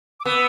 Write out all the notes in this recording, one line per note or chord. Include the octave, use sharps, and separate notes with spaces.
D6
B3 E6